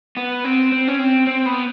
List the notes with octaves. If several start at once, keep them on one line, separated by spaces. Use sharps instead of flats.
B3
C4
C4
C#4
C4
C4
B3